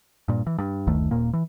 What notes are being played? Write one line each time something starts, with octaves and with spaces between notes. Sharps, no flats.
G2 A#2
E3
G2
F#1 D2 D#3 A3
D#1 A#2 A#3
E3